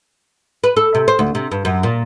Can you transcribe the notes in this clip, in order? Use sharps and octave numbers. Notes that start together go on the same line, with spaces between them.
B4
A4
C3
C5
D2
C3
G2
F#2
A#2